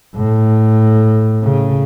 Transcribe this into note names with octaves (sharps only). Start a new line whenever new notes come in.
A2
C#3